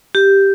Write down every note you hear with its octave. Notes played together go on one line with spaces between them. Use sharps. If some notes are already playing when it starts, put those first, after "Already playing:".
G4